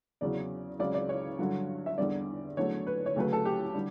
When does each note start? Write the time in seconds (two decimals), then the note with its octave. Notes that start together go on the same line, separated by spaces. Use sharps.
0.21 E2 C#3 F#3 D5
0.79 C#2 C#3 F#3 D5
0.94 D5
1.09 C#5
1.39 G2 D3 F#3
1.86 E5
1.98 E2 D3 G3 D5
2.57 E2 D3 F#3 A3 C#5
2.87 B4
3.06 C#5
3.16 D2 C#3 F#3 A3 B4
3.33 A4
3.45 G4
3.74 D3 G3